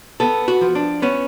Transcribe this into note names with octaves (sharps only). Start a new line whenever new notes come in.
B3 A4
F#4
F3
D4
B3 C#4